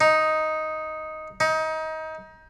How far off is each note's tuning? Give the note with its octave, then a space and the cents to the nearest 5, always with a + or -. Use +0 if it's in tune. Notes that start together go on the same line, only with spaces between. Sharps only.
D#4 +5
D#4 +25